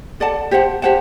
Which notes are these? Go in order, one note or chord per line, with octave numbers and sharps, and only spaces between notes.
A4 D5 F#5 A5
G4 C5 F#5 A5
G4 C5 F#5 A5